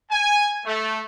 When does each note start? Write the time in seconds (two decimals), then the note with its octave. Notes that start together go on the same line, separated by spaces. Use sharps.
0.11 G#5
0.66 A3